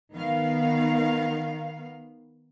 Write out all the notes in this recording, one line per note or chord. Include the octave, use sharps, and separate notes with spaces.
D#3 B3 F5